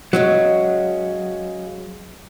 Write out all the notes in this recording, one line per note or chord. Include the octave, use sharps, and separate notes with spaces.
C#3 F#3 G#3 C#4